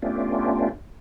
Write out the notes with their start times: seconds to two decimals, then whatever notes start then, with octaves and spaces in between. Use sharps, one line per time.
0.02 A3 B3 C#4 D4 F4 G4